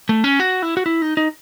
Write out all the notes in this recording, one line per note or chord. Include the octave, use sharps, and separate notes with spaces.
A3
C#4
F#4
E4
F#4
E4
D#4
D#4